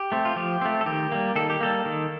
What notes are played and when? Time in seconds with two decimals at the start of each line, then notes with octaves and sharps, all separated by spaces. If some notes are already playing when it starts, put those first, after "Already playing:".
Already playing: G4
0.12 A3 C4
0.25 F4
0.36 F3 G4
0.62 A3 C4
0.81 A4
0.86 D#3 G4
1.12 G3 A#3
1.36 D#3 A4
1.50 G4
1.60 G3 A#3 A4
1.86 D#3